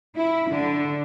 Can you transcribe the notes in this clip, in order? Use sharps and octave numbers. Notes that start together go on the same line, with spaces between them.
E4
D3